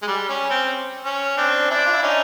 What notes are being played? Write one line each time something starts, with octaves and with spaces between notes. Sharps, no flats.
G#3
G3
C#4
C4
C#4
C4 D4
D4 E4
F4
E4
C#4 D#4